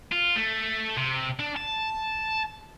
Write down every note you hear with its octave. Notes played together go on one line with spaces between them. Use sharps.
F4
A3
C3
D4
A5